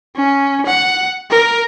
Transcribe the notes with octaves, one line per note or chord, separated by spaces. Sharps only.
C#4
F#5
A#4